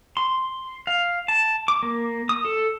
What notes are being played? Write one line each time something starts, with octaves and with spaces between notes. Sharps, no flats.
C6
F5
A5
D6
A#3
D#6
A4